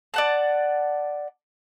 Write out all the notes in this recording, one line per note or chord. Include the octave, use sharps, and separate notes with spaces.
D5 F#5 A5